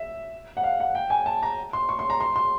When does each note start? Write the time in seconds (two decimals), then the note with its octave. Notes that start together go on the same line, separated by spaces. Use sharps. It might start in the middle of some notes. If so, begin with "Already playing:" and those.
Already playing: E5
0.57 F#5
0.63 F5
0.80 F#5
0.95 G5
1.10 G#5
1.26 A5
1.43 A#5
1.73 C6
1.89 C#6
1.99 C6
2.10 A#5
2.20 C6
2.36 C6